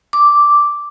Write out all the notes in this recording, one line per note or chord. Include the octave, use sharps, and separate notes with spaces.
D6